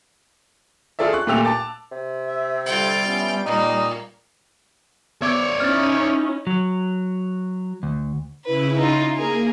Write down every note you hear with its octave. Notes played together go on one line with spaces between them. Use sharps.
F4 G#4 A4 D5 E5
C#6 F#6
A#2 A3 G4 E6 F7
A5 D6 A6
C3
E5
D3 G3 F4 G5
B3 C#4 E4
A#2 A#3 D#4 D#5
B3 C#5 D5 D6 G#6
C#4 D#4 E4 F6 A6
F#3
D2
C#3 E4 B4
D#4 F4
A#3 G#4 A#4